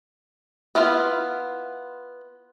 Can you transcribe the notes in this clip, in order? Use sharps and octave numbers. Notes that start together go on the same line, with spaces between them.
B3 E4 F4 F5